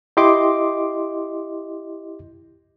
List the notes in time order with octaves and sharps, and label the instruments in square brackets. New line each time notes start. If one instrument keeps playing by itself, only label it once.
[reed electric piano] E4 G4 D#5 C6 D6